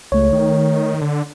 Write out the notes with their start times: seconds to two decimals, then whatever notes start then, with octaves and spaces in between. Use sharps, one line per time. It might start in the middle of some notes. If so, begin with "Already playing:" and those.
0.12 C#2 A3 C#5
0.32 D#3
1.01 D3